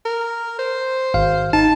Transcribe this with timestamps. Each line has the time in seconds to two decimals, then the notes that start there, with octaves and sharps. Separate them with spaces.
0.05 A#4
0.59 C5
1.14 G#1 F5
1.53 D#4 A5